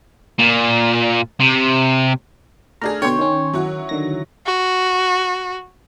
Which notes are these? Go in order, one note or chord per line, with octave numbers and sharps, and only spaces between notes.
A#2
C3
A3 D4 G#4 A#5 F6
B2 D3 C#5 G5 C6
D#3 C#4
F#3 E4 F#4
D3 D#3 A#6
F#4